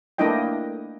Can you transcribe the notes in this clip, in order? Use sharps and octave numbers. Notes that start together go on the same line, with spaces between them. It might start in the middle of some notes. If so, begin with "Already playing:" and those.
A3 A#3 D4 E4 D#5 G5